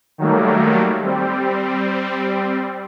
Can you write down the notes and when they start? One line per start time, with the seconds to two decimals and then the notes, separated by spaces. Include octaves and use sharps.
0.18 D#3 F#3 G3 A3 A#3
1.03 G3 C4